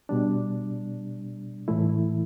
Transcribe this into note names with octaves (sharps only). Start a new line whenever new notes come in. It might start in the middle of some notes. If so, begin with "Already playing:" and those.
B2 G3 D4
A2 E3 A3 E4